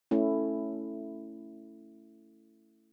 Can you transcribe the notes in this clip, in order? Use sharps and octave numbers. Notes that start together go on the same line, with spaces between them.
A3 C#4 E4